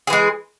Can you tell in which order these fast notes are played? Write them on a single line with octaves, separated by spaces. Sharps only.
G#4 E3 G#3